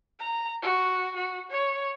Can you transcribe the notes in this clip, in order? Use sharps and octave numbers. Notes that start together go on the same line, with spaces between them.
A#5
F#4
F#4
C#5